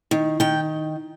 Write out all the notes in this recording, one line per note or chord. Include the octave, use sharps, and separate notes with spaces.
D#3
D#3 G5